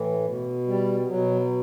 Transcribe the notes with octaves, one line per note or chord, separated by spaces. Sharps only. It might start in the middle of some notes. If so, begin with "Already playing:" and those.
Already playing: A2 E3
B2
G3
B2 F#3